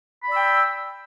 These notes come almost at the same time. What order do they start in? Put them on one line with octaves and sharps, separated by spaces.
B5 D5 E6 G5